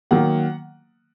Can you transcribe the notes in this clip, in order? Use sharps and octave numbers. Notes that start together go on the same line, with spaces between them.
D#3 F#3 A#3 F#5